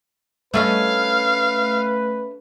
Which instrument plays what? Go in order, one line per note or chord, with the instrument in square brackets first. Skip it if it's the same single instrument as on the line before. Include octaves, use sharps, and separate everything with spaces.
[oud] A3 C#4 D#5 [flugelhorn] B4 [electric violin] F5